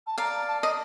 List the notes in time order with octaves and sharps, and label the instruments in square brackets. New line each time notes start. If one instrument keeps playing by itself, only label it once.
[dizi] A5
[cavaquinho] D5 F5 [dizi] A#5
[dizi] A5
[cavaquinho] D#5